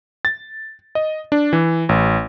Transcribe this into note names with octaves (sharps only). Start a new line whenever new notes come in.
A6
D#5
D4
E3
A1